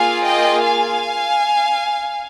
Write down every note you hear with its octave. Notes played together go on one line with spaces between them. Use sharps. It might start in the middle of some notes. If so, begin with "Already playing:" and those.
Already playing: A#3 F4 G#4 F5 G#5
D#5 G5
F5 G#5